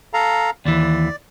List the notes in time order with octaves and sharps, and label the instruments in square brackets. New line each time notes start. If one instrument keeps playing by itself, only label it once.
[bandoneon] A4 F5 A#5
[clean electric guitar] D#2 E3 [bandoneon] D5